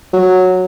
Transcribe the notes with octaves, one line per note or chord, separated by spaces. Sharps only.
F#3